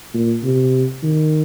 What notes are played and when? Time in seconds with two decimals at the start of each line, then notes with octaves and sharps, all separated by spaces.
0.14 A#2
0.43 C3
1.03 D#3